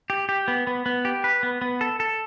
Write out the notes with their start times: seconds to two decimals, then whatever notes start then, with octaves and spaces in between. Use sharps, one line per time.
0.10 G4
0.29 G4
0.48 B3
0.67 B3
0.86 B3
1.05 G4
1.24 B4
1.43 B3
1.62 B3
1.81 A4
2.00 A4